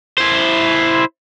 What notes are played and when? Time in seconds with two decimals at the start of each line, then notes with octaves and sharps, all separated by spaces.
0.18 E4 C5